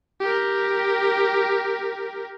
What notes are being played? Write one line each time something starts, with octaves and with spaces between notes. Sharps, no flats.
G4 A#4